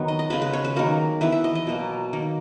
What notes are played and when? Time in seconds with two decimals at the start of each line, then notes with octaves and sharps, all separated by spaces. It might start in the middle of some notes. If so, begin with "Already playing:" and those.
Already playing: D#3 F#3 B3
0.08 D#5
0.19 D#5
0.30 C#3 G#3 B3 B4
0.42 B4
0.53 C#5
0.64 B4
0.76 D#3 F#3 A#3 A#4
1.21 E3 B3 B4
1.32 E5
1.44 D#5
1.55 D#5
1.67 B2 F#3 A#3
2.13 D#3 A#3